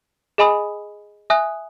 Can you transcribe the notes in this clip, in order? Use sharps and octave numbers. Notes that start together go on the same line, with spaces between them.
G#4 D#5 G#5 B5 D#6
E5 G#5 D#6 F#6